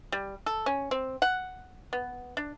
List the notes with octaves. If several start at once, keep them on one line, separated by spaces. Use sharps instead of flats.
G3
A4
C#4
C4
F#5
B3
D4